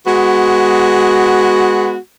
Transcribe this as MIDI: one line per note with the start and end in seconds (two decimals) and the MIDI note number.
0.07 1.97 56
0.07 1.97 59
0.07 1.97 66